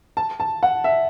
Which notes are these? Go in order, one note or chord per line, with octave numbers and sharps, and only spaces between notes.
A5
A5
F#5
E5